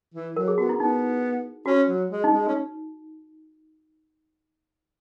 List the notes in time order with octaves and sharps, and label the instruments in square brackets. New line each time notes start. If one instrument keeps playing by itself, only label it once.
[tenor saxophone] E3
[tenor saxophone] F#3 [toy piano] A#4
[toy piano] G#4
[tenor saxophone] B3 [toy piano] F#4
[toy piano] E4
[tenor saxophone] B3 [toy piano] D#4
[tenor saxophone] C#4 [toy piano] F#4
[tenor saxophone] F#3
G#3
[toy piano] D#4
[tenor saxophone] G#3
C#4